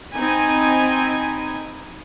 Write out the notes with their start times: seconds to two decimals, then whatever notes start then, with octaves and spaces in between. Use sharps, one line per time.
0.12 C4 D#4 G#5 B5